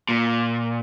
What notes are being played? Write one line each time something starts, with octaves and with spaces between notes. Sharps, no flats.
A#2